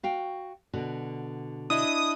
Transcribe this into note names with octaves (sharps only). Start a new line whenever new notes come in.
F#4 F5 G5
B2 D3 F#4
D4 E4 D#5 D#6